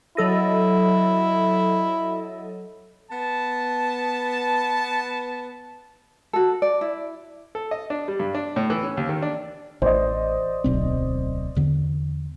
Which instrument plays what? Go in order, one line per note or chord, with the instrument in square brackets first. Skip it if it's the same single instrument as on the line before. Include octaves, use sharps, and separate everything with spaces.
[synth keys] F#3 A4 D#5 [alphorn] E4
[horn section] B3 A5
[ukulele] F#4 A4
D5
E4
[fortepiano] A4
D#5
D4
G3
G2
D4
A2
E3
C#4
D#2
D#3
D4
[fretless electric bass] A1 [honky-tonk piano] C5 D5 D#5
[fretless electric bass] D1 B1 C4
E2 D3